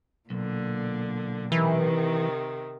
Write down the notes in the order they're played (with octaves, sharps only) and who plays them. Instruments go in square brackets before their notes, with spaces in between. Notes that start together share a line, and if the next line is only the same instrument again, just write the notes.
[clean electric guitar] B1 [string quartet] A#2 D3
[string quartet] C3 D#3 [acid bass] E3